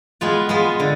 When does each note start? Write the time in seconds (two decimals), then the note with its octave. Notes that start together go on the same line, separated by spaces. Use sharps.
0.21 G#3 B3 F4
0.49 G#3 B3 F4
0.80 D3